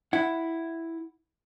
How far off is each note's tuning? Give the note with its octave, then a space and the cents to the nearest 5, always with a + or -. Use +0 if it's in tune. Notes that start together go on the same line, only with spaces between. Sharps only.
E4 +0 F#5 +0